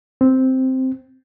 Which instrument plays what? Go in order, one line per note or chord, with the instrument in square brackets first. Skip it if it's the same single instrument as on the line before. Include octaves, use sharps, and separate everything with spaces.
[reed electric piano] C4